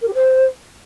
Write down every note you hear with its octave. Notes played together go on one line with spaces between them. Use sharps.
A#4
G4
C5